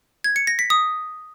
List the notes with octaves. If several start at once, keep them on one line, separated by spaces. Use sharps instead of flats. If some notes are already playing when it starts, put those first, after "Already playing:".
G#6
C#7
A#6
B6
D#6